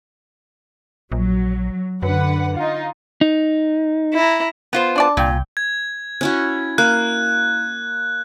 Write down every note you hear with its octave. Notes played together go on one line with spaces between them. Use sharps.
A#1 F#3
F#2 D3 B4 F#5
D#4 F4
D#4
E4 A#5
B3 F4 C5
D4 D5 A5
C2 A#2 G5
G#6
C#4 E4 F#4
A#3 F#6